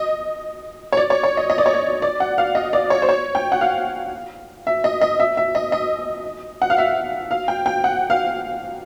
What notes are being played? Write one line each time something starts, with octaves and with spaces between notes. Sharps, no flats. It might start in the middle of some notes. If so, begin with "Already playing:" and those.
Already playing: D#5
C#5
D5
C#5
C#5
D#5
D#5
D5
C#5
D5
D5
F#5
F5
D#5
D5
C#5
C5
C#5
G5
F#5
F5
E5
D#5
D#5
E5
E5
D#5
D#5
F#5
F5
E5
F5
G5
G5
F#5
F5